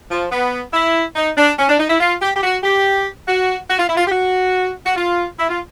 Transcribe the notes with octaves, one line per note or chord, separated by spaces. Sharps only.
F3
B3
E4
D#4
D4
C#4
D4
D#4
E4
F4
G4
G4
F#4
G4
F#4
F#4
F4
E4
F4
G4
F#4
F#4
F4
E4
F4